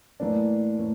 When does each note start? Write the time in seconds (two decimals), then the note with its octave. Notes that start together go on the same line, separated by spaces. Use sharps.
0.20 A2 E3 A#3 D4
0.79 A2 E3